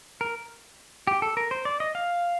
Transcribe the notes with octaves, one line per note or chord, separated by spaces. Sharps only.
A#4
G4
A4
A#4
C5
D5
D#5
F5